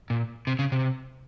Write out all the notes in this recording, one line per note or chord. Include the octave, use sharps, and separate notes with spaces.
A#2
C3
C#3
C3